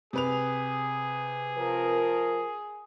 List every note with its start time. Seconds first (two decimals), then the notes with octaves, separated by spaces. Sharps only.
0.13 C3 G#4 B4 F7
1.56 F3 F4 A#4